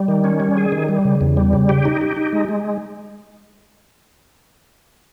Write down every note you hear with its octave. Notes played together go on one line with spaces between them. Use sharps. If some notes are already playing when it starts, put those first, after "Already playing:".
Already playing: G3
D#3
C#4
G3
G#4
D#3
G3
C#3
E2
G3
C#3
G4
D#4
G4
D#4
G#3
G#3